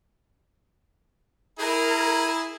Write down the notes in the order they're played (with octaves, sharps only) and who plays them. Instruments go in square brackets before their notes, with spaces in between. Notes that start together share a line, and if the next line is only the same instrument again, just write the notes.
[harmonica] E4 G#4 [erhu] A#4